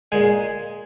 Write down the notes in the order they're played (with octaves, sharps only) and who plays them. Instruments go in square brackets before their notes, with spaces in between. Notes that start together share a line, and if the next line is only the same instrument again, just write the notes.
[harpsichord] A#2 G#3 G#5